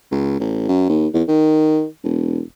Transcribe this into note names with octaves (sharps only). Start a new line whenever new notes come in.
C#2
A1
F#2
D#2
E2
D#3
E1